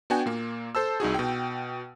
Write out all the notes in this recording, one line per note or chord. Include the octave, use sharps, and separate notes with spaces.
B3 D4 F#4 G5 G#5
A#2 A#3
A4 C5 A5 E6
C2 D#4 F#4 G#4
B2 G5